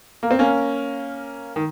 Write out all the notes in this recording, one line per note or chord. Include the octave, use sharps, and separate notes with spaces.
A#3
C4
A#3 C#4
D#3